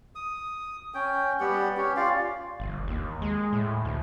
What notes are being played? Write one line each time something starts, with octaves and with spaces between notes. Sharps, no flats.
D#6
C#4 G5
G3 B3 G4 F#5
C#4 G4
F4 D5 F5
G1
D#2
G#3
A2
D2